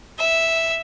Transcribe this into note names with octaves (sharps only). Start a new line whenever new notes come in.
E5